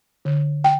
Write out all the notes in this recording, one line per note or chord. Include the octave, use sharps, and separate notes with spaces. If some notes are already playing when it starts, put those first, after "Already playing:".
D3
G5